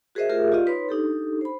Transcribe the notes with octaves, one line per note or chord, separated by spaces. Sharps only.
F#4 G#4 A#4 C5 D#5 E5
A3 F4 G4 G#4 A#4 E5
F4 G4 D5 D#5 F5
D#4 B4 C#5 B5 C6
D4 D#4 G4 A4
C5 B5